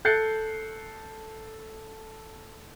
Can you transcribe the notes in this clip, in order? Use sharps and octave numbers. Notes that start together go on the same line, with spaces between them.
A4 F#6 G6 A6 C7 C#7